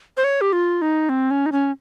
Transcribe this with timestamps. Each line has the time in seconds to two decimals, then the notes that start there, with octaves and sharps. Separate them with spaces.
0.17 C5
0.24 C#5
0.41 G4
0.53 F4
0.82 D#4
1.09 C4
1.31 C#4
1.46 D#4
1.52 C#4